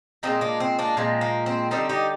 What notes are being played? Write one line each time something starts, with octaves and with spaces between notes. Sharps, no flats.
A#2 F3 G#3 C4 D#4
A#3 D4
C4
A#3 D4
A#2 F3 G#3 C4
A#3
C4
D3 G3 C4 D#4
D#4 G4